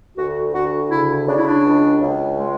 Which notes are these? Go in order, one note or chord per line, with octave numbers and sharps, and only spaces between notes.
D2 F#4
D2 F#4
C#3 E4
C#3 D4
E4
D4
C#2
C#2
G#3